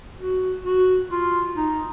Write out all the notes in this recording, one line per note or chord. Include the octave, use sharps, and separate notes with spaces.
F#4
F#4
F4
D#4